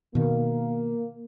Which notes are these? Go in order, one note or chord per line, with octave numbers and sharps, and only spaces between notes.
B2 D#3 A#3